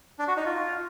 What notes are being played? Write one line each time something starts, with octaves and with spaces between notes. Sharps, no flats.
D4
F#4
D#4
F4